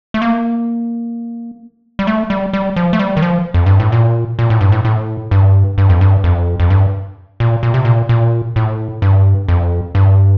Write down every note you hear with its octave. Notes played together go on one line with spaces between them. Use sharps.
A3
A#3
G3
A3
G3
G3
F3
A3
G3
D#3
F3
F2
G2
A2
A#2
A#2
A2
G2
A2
A2
G2
G2
F2
G2
F2
F2
G2
A#2
A#2
C3
A#2
A#2
A2
G2
F2
G2